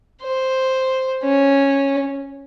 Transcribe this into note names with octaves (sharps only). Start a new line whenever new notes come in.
C5
C#4